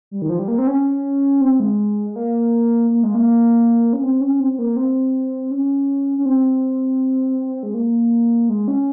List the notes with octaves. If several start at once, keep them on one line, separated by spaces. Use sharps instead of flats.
G3
D#3
F3
G3
A#3
C4
C#4
C4
G#3
G#3
A#3
A#3
G#3
A#3
C#4
C4
C#4
C4
C4
A#3
C4
C#4
C#4
C4
G#3
A#3
G#3
C#4